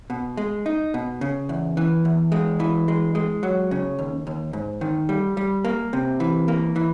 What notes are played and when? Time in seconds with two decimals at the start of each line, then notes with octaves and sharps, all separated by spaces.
0.10 B2
0.37 G#3
0.66 D#4
0.94 B2
1.21 C#3
1.49 E2
1.77 E3
2.05 E2
2.32 G#3
2.60 E3
2.88 G#3
3.15 G#3
3.43 F#3
3.71 C#3
3.99 D#2
4.27 D#2
4.53 G#2
4.81 D#3
5.09 G3
5.37 G3
5.65 A#3
5.93 C3
6.20 E3
6.48 A#3
6.76 E3